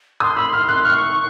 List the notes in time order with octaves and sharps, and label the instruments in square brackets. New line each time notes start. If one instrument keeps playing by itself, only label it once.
[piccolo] C6 [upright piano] D#6
[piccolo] B5 [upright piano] E6
[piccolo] C6 [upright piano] F6
[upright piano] F#6
[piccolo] C#6 [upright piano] F6